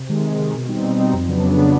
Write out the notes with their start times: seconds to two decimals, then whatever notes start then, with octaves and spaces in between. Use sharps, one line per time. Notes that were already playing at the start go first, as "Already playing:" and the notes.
Already playing: C3
0.09 D#3 G#3
0.24 C3
0.39 D#3 G#3
0.54 B2
0.68 G3 C4 D#4
0.83 B2
0.99 G3 C4 D#4
1.13 F2
1.28 C#3 F#3 B3 D4
1.43 F2
1.57 C#3 F#3 B3 D4